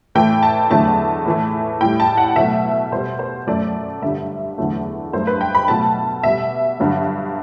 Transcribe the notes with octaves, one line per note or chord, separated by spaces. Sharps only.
A2 E3 A3 G5
A5
E2 D3 F#3 A3 A5
A2 E3 A3
A2 G3 G5
A5
F#5
B2 F#3 A3 E5
B2 G3 C5
C5
F#2 F#3 A3 D5
G2 D3 G3 E5
E2 D3 F#3 A3
G2 F#3 A3 C5
B4
G5
B5
B2 F#3 A3 A5
B2 G3 E5
G2 D3 F#3